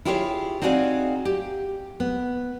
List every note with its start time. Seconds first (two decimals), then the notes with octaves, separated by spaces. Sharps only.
0.05 E4 F4 G4 G#4 C5 C#5
0.62 C4 D#4 F#4 G#4 D5 F5
1.25 G4
2.00 B3